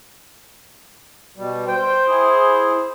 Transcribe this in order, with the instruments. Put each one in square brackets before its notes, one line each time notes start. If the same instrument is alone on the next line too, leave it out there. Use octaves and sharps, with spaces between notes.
[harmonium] B2 G3
[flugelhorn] C5 [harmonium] G5
[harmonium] E4 G#4